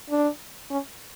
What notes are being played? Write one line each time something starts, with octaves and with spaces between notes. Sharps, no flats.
D4
C#4